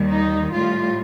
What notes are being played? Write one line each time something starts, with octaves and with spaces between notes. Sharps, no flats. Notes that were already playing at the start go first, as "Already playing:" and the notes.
Already playing: D#2 D#3 G3
D#4
A2 G3 F4